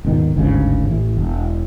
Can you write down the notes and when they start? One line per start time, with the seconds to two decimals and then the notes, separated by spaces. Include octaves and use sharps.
0.04 D#1 G#2 B2 D#3
0.36 G1 D2 G#2 C#3
0.90 A1 E3
1.16 E1